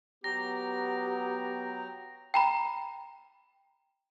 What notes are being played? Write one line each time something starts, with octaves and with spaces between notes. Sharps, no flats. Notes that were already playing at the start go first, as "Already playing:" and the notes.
F#3 B3 G4 G5 A#5 A#6
G5 A#5 B5